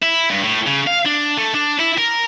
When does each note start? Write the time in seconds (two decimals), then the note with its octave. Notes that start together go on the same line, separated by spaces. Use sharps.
0.02 E4
0.30 G2
0.44 A2
0.66 C#3
0.87 F5
1.05 D4
1.37 A3
1.54 D4
1.79 E4
1.98 A#4